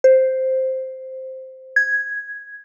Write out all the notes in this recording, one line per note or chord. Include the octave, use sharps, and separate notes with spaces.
C5
G#6